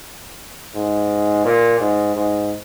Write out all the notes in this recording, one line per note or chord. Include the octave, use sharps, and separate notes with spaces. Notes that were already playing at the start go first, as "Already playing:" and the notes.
G#2
A#2
G#2
G#2